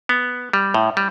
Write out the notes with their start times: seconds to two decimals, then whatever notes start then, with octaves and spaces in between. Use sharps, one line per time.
0.09 B3
0.53 G3
0.74 A2
0.97 G3